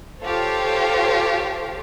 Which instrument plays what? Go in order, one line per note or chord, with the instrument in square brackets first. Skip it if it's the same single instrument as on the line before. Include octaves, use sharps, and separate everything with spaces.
[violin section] F4 G4 A4 C5 C#5 F5